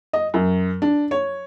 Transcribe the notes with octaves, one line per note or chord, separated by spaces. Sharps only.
D#5
F#2
D4
C#5